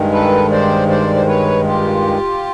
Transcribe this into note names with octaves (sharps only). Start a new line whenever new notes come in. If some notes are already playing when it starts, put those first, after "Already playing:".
Already playing: G2 D#3 G#3
A4 B4
C5 D5
C5 D5
C5
B4 C#5
F4 G4